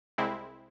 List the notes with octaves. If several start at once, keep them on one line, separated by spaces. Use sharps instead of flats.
C2 C3 G#3 C4 E4